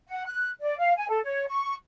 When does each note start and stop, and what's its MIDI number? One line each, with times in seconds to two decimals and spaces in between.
0.08 0.23 78
0.26 0.50 90
0.61 0.77 74
0.78 0.93 77
0.97 1.07 80
1.09 1.19 69
1.24 1.44 73
1.47 1.73 85